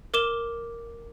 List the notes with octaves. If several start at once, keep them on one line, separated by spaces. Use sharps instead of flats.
A#4 D6 E7 G7